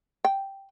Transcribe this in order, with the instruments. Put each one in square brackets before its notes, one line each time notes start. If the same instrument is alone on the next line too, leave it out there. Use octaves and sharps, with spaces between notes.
[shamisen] G5